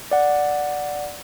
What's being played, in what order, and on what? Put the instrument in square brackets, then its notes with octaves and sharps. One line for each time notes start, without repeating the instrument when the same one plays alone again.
[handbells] D5 F#5